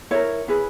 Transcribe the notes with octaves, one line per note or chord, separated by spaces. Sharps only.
E4 A#4 C#5
E4 G#4 B4